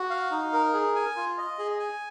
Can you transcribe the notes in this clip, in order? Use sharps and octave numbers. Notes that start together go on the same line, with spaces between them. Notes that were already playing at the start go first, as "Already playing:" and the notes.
Already playing: F#4
F5
D#4
A#4
G#4
G#5
F4
D#5
G#4
G#5